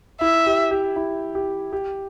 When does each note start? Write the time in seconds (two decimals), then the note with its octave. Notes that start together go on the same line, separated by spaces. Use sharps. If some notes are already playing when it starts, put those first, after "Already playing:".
0.21 E4 E5
0.46 G4
0.71 G4
0.96 E4
1.35 G4
1.73 G4